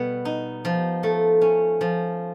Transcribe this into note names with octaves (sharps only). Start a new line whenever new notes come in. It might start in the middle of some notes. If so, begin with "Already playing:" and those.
Already playing: B2 G3 B3
D#4
F3
A3
C#4
F3